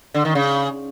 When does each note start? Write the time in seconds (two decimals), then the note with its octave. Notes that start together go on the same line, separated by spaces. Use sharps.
0.14 D3
0.25 D#3
0.35 C#3